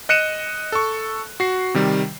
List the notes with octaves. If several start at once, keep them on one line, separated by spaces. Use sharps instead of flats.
D#5 F#6 C#7 D#7 E7
A4 C#6
F#4 C7
C3 D#3 G3